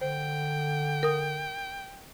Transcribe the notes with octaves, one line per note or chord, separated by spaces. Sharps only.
D3 C5 G5
A#4 D#6